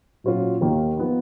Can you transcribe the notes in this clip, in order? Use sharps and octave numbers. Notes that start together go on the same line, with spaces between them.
A#2 F#3 C#4 F4
D#2 D#3 A#3
F3 B3 D#4